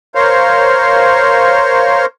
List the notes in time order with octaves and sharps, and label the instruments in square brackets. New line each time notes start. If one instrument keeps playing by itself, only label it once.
[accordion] A#4 C5 C#5 F5